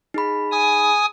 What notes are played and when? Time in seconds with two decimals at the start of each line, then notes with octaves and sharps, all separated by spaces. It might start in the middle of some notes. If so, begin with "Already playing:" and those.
0.14 D#4 G#4 B5
0.52 G#5 D#6